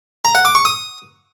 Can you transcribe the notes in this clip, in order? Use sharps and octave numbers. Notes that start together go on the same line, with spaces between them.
A#5
F#5
D6
C#6
D#6